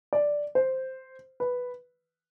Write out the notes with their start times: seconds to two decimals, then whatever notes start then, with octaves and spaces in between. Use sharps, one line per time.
0.13 D5
0.55 C5
1.40 B4